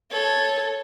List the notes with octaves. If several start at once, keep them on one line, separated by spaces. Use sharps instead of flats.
A4 C#5